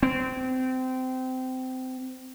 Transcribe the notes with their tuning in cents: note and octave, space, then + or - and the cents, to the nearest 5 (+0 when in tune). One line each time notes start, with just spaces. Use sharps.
C4 -25